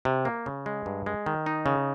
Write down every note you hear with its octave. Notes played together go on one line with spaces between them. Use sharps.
C3
A#3
C#3
G#3
G2
G#3
D#3
D#4
C#3